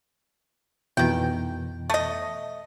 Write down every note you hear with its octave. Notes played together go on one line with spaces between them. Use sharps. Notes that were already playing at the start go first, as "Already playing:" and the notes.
F2 B2 D#3 E3 G5
A3 D#5